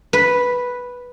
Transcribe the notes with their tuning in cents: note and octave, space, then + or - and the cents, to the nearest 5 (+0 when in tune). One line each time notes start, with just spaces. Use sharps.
B4 -5